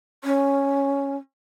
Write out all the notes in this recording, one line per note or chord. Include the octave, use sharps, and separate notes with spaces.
C#4